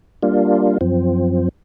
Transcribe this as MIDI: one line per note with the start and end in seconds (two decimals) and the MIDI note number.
0.23 0.78 55
0.23 0.78 58
0.23 0.78 62
0.23 0.78 65
0.81 1.49 42
0.81 1.49 53
0.81 1.49 60